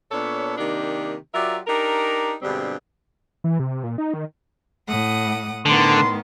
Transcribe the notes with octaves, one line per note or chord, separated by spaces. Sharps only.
A#2 B3 D4 A4 C#5
C3 D#3 A#3 D4 D#4 G4
F#3 F4 G4 A#4 D5 E5
D4 D#4 G4 A#4
G2 B2 D3 G3 G#3 C4
E3
C3
A#2
D#4
D#3
A2 F#5 D#6
A2 D3 D#3 B3 C6